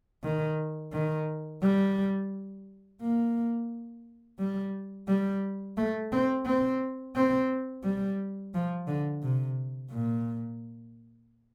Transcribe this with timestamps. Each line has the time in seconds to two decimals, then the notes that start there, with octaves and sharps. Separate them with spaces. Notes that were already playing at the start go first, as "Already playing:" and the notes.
0.24 D#3
0.93 D#3
1.62 G3
3.01 A#3
4.39 G3
5.08 G3
5.77 A3
6.12 C4
6.46 C4
7.16 C4
7.84 G3
8.54 F3
8.87 D3
9.23 C3
9.91 A#2